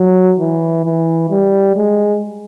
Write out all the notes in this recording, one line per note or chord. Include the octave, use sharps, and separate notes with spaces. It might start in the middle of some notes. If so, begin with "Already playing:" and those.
Already playing: F#3
E3
E3
G3
G#3